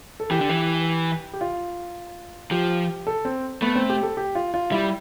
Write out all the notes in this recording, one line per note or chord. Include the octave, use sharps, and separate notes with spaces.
A4
E3 G4
D3
E3
G4
F4
F3 G4
A4
C4
A3 B3
C4
G4
A4
G4
F4
F4
G3 E4